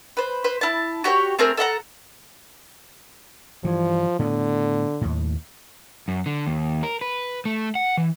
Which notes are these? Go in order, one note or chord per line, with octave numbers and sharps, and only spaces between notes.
B4 C5
B4 C5
E4 A5
F#4 G4 A4 C#5
A3 C4 G#4 A#4
A4 E5 F#5 A#5
G2 E3 F3
A2 D3 B3
D#2 A2
F#2
D3
D#2
A#4
B4
A3
F#5
E3